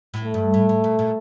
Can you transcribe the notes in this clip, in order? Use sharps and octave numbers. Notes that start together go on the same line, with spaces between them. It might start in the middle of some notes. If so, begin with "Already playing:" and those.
A2
A3
G2
A2
A2
A#2
A#2